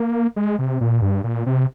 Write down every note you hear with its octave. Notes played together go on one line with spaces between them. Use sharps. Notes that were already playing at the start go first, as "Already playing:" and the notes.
Already playing: A#3
G#3
C3
A#2
G2
A#2
C3